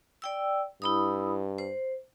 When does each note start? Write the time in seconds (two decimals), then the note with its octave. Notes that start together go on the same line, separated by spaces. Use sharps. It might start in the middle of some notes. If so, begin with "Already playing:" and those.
0.22 D5 G5 E6
0.82 G2 E4 B5 D#6
1.58 C5